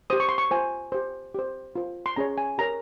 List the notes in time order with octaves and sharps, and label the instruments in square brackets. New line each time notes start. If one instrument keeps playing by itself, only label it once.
[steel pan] G4 C5 D#6
C#6
C6
C#6
F4 C5 G#5
G4 C5
G4 C5
F4 C5
C6
C#4 G#4 C#5 A#5
G#5
G4 A#4 C#5 A#5